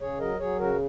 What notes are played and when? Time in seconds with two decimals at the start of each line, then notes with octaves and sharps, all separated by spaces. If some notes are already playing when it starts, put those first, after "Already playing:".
0.01 C#3 G#4 C#5
0.20 F#3 A#4 D#5
0.39 F#3 G#4 C#5
0.59 C#3 F#4 A#4